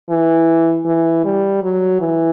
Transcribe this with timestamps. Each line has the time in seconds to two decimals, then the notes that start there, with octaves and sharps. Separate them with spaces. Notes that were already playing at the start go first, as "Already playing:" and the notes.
0.10 E3
0.86 E3
1.25 G3
1.63 F#3
2.01 E3